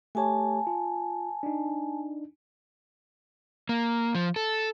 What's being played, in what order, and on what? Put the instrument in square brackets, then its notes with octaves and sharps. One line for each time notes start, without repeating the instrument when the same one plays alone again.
[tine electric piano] A3 G4 C#5 [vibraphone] G#5 A5
[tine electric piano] F4
D4 D#4
[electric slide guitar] A#3
F3
A4